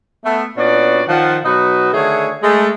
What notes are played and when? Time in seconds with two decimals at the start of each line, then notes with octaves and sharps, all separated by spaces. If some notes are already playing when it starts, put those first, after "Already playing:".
0.25 A3 B3
0.57 A#2 B3 C#4 D4 F#4 D5
1.07 D#3 F3 F#5
1.45 B2 F#3 D#4 F#4 B4
1.93 D3 D#3 A3 G#4 C#5
2.42 G#3 A3